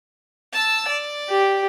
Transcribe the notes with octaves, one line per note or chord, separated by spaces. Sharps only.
A5 E6
D5
G4